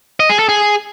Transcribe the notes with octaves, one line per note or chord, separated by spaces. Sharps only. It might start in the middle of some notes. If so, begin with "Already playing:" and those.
D#5
G#4
A4
G#4